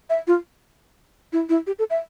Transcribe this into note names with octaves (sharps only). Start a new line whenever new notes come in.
E5
F4
E4
E4
G4
A4
E5